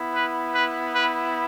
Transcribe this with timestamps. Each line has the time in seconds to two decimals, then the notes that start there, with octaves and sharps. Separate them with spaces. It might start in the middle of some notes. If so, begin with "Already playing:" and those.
Already playing: B3 E4
0.13 B4
0.53 B4
0.93 B4